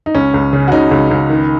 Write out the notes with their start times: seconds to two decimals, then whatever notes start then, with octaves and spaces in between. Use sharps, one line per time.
0.06 D#4
0.15 C#2 C#4
0.34 C#2
0.53 C#3
0.68 F#4
0.72 C#3 D#4
0.91 C#2
1.11 C#2
1.29 D#3